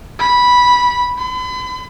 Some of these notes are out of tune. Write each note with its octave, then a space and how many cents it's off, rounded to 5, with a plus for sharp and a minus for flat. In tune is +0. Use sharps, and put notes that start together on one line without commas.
B5 -10
B5 +40